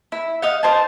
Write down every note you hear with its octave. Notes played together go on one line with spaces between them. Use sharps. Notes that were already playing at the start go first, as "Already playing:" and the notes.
E4
D#4 F5 F#5
D#4 C5 G#5 A5